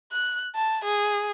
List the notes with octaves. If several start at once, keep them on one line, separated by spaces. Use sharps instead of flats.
F#6
A5
G#4